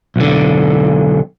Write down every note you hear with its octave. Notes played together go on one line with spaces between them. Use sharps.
B1 D3